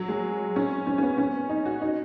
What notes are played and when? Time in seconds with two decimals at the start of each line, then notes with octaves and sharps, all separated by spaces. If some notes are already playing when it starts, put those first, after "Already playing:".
Already playing: F#3
0.09 G#3
0.56 C#4
0.87 C#4
0.98 C#4
1.03 B3
1.18 C#4
1.49 D#4
1.66 F#4
1.81 D#4